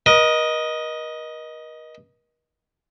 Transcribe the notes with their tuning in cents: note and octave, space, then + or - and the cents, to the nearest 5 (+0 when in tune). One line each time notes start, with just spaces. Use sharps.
A#4 +45 D#5 +0